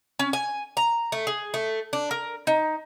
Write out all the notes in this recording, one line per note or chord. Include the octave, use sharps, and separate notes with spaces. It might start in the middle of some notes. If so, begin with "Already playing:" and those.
C#4
G#5
A#5
A3
G#4
A3
D4
A#4
D#4